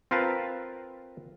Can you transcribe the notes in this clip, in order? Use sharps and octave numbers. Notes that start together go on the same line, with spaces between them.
C4 F4 A#4 B4 F5 A5